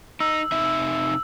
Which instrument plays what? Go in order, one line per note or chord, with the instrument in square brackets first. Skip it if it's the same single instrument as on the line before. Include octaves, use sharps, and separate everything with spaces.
[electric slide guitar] D#4 [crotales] E6
[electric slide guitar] C3 D#4 E5